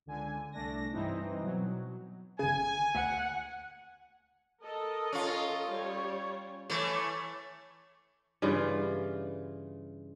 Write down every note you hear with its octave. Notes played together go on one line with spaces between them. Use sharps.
C#2 D3 G#5
C2 A3 D4 A#6
G2 E3 C4 D#4
B2 F#3
G1 C#3 G#5
D2 F#5
A4 A#4 D#5
C#4 F4
G3 C#5
E3 A3 C#5
G2 C#3 E3 F4